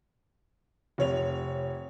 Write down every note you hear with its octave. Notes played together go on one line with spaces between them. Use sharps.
F1 C#5 F7